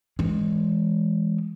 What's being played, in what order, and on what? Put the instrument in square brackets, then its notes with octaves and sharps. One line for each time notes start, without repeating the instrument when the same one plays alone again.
[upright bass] E3 G#3